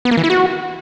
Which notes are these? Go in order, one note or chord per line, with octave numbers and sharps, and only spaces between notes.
B3
A#3
E3
E4
F#4